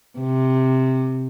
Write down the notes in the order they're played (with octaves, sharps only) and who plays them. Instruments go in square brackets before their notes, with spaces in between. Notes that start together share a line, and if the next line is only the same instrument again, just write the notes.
[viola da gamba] C3